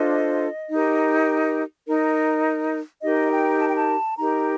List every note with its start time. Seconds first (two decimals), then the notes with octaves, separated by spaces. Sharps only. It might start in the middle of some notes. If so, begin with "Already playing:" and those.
Already playing: D4 F4 A4 C5 D#5
0.70 D#4 G4 A#4
1.86 D#4 A#4
3.03 D#4 G4 A#4 D#5
3.31 G5
3.60 A5
3.68 G5
3.77 A5
4.18 D#4 G4 A#4 A#5